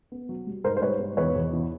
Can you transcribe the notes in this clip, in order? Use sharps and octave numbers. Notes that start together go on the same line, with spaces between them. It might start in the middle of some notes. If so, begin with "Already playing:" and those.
B3
F#3
G3
G#2 A#4 C5
C5
G3 B4 C#5
G#2
E2 B4 C#5
E2
E3